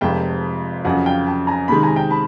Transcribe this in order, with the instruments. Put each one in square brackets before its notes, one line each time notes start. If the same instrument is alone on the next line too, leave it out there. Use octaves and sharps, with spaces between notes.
[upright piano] F1 F2 C3 F3 G#3 [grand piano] G5 A5
[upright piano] F2 C#3 F#3 [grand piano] F#5 G#5
[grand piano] F5 G5
G5 A5
G#5 A#5
[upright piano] C3 D#3 G#3 [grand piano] A5 B5
[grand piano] G#5 A#5
G5 A5
A5 B5